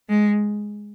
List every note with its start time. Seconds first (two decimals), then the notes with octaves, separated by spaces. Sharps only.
0.09 G#3